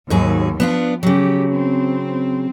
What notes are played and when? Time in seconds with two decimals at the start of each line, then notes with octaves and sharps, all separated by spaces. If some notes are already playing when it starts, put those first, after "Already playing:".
0.10 D#2 G#2 F#3 G#4
0.60 F3 B3 D4 F4
1.03 C#3 F#3 G4
1.52 C4